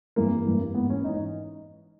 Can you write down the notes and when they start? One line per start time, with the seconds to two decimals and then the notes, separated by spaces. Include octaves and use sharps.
0.16 G2 E3 A#3
0.46 G2 E3
0.75 G#2 E3 B3
0.90 C#4
1.04 G#2 E3 D#4
1.14 D#4